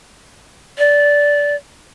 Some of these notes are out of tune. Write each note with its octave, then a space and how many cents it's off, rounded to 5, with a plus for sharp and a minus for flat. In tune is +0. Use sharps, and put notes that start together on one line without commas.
D5 -15